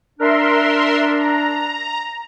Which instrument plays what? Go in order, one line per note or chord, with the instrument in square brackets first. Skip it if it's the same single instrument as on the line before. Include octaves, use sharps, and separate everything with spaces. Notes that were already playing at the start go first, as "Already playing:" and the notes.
[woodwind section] D4 [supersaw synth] A#4 E5 C6
[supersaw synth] A#5